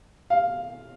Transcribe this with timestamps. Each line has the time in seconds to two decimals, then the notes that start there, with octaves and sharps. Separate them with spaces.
0.30 F5